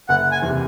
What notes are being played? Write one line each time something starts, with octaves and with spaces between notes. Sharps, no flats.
F#1 F#5
G#5
E2 C3